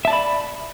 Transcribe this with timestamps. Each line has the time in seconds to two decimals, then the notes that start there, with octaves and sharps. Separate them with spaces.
0.05 E5
0.07 A5
0.10 D5
0.13 B5